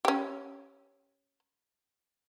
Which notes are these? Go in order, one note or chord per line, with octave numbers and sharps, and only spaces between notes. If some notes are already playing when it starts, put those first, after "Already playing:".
C#4 G4